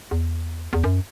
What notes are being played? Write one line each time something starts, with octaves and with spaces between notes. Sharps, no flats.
E2
E2
F#2